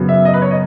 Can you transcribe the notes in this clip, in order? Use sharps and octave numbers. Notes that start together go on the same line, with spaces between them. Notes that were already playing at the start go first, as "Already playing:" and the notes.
Already playing: F#2 C#3 F#3 B3
E5
D#5
B4
C#5
D#5